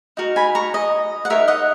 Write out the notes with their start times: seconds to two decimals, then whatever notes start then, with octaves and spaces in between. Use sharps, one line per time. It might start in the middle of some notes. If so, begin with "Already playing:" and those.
0.17 D#4 F#4 A#4
0.36 G#5 B5
0.55 A#5 C#6
0.74 D#5
1.25 F#5
1.30 D#4 A#4 C#5 E5
1.48 D#5 F#5